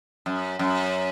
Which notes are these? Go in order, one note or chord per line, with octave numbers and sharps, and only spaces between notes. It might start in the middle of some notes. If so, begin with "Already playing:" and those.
F#2
F#2